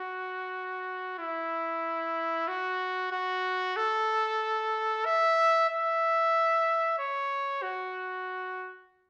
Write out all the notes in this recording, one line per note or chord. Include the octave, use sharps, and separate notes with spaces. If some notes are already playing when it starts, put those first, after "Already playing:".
Already playing: F#4
E4
F#4
F#4
A4
E5
E5
C#5
F#4